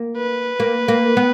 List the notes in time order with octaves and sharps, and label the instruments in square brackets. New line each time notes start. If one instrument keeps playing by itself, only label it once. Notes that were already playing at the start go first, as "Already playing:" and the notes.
Already playing: [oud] A#3
[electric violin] B4
[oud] A#3
A#3
B3